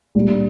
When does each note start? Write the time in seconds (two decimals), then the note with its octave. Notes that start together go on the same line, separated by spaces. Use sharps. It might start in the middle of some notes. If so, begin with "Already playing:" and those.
0.15 A#2 G3 A#3 D4